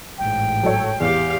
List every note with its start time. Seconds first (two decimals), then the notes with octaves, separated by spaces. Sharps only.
0.18 A1 G#2 G5
0.63 F#3 A4 C#5
1.00 E2 G4 F5